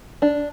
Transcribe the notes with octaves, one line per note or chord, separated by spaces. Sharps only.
D4